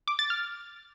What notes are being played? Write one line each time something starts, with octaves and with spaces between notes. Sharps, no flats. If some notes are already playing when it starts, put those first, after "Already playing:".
D6
A6
F6